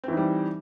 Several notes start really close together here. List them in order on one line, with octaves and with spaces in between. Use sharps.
C4 E3 D#4 G3